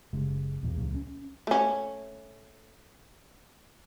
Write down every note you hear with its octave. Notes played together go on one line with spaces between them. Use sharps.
F#1 C#3 G#3
B1 E2 A#2
C#2 A#2 F#3
C#4
A3 C#4